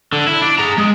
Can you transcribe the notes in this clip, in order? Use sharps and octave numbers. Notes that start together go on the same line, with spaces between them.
D3
E4
D4
G#4 A#5
G#3